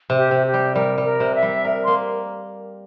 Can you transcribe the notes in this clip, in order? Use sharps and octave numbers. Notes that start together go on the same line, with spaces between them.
C3
G4
C3
G4
G3
G3 A#4
G3
A#4
C3
E5
G3
A#4
A#3 C6